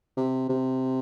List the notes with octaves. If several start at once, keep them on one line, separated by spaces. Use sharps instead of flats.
C3
C3